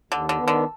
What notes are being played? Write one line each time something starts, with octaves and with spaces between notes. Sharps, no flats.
D#2 D3
D3
D#3 B3
D3